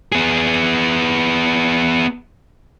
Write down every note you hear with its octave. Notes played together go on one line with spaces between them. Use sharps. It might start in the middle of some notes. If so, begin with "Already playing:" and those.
B3 G#4